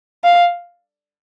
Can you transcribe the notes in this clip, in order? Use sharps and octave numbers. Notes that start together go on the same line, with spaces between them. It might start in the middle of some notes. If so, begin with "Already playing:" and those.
F5